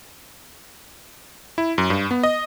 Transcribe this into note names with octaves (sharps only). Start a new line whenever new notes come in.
E4
F#2
G2
B3
D#5